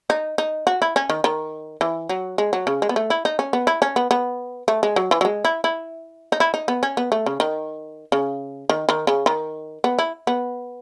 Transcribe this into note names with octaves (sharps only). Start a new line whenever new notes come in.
D#4
D#4
F#4
E4
C#4
D#3
D#3
E3
F#3
G#3
F#3
C#3
G#3
B3
A3
E4
D#4
C#4
B3
E4
C#4
B3
B3
A3
G#3
F#3
E3
F#3
G#3
E4
E4
D#4
E4
D#4
B3
C#4
B3
A3
C#3
D#3
C#3
D#3
D#3
C#3
D#3
B3
E4
B3